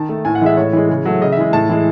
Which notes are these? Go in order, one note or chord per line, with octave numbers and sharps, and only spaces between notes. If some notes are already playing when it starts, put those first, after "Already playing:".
Already playing: D#3 A5
A3
A2 G#5
F#5
E3 G#3 E5
A2 C#5
E3 G#3
C#3
F#3 A3
C#3 D#5
E5
E3 G#3
A2 A5
E3 G#3